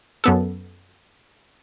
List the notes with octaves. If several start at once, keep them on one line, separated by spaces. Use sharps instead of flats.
F#2 B3 A4